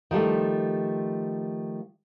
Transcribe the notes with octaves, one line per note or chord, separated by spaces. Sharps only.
D#3 F3 G3 A3